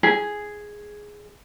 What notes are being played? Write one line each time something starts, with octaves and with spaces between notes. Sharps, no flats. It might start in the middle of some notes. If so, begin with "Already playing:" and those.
G#4